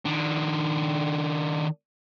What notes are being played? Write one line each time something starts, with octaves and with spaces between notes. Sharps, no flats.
D#3 D4